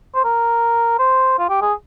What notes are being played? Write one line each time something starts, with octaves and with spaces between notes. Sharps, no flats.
C5
A#4
C5
F4
G4
G#4